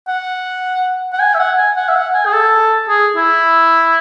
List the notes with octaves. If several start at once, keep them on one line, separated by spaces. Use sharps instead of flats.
F#5
F#5
G#5
E5
F#5
G#5
F#5
E5
F#5
G#5
G#4
A4
G#4
E4